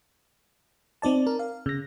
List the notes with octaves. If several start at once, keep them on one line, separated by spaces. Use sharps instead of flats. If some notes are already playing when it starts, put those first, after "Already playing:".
C4 D#4 D5 A5
A#4
F5
C#3 A#6